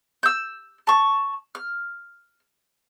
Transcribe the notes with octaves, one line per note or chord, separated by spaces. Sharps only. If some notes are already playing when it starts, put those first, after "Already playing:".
E6 G6
A5 C#6
F6